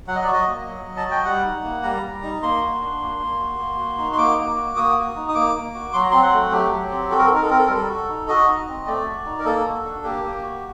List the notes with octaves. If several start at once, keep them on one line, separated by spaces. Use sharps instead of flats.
F#3 F#5
D#5
D5
F#4
D#5
A#3
F#3
F#3
A5
F#4
G5
G3 F#5
D#4
A#3
G3 A#5
G3
D#4
A#3 C6
F#4
D4
A#3
A#3
F#4
A#3
F#4
D#4
C6
A#3 D6
A#3
F#4
A#3 D#6
F#4
D#4
D#6
A#3 D6
A#3
F#4
F#3 C6
A#5
C4 C6
F#5
A3
F#3 G4
F#3
C4
F#4 A4
A#4
A4
D#4 A#4
A4
C4 A#4
A4
A#4
G3 A4
F#4
D#4
F#4 D#5
D#4
C4
A3 D5
F#4
D#4
A#4
A#3 A4
F#4
D4
A#3 G4
A#3
F#4